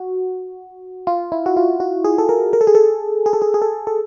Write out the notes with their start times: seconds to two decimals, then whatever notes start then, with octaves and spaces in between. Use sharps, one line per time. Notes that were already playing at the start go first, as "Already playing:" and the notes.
Already playing: F#4
1.07 F4
1.32 E4
1.46 F#4
1.57 F4
1.80 F#4
2.05 G#4
2.18 A4
2.29 A#4
2.53 A#4
2.61 A4
2.67 G#4
2.75 A4
3.26 G#4
3.33 A4
3.42 G#4
3.54 G#4
3.62 A4
3.87 A4